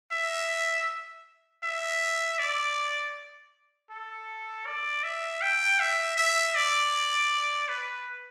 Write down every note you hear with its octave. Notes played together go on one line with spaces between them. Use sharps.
E5
E5
D5
A4
D5
E5
G5
E5
E5
D5
B4